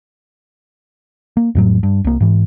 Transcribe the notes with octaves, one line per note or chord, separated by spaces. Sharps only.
A#3
F2 A2 F#3
G2
C2 A#3
G#2 E3